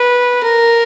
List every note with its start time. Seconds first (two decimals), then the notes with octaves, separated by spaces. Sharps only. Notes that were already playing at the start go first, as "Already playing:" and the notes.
Already playing: B4
0.43 A#4